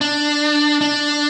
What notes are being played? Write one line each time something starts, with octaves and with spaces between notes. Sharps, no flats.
D4
D4